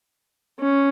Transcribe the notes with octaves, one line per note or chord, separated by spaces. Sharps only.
C#4